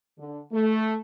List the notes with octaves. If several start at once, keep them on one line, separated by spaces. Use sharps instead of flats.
D3
A3